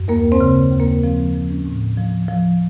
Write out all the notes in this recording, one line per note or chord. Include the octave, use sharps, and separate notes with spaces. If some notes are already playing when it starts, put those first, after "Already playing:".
Already playing: F#2
D#2 A#3 A#4
C4 C5
C#3
D#2
A#3 A#4
F3 C4
F3
C#4
A2
F3
F3